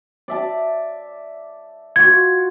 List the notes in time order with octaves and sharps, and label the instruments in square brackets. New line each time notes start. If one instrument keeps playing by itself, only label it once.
[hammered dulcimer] D5 E5 A5
[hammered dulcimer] F4 F#4 [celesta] G#6